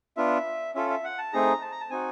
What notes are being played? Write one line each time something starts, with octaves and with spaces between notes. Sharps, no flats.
B3 D4 F4 E5
C#4 F4 A4 E5
E5
F#5
A5
A3 C4 D#4 G#4 A#5
A5
A#5
A5
C4 D#4 F#4 G#5